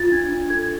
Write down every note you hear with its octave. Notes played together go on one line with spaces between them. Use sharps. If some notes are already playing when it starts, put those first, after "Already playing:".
Already playing: F4 A6
D4 G#6
D4
A4 G#6